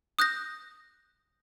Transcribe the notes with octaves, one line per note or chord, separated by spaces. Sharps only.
D#6 F#6 G6 A#6